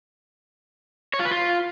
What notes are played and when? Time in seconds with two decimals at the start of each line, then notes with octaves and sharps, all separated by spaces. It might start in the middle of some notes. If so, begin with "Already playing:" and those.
1.14 C#5
1.19 F4
1.25 B4
1.31 F4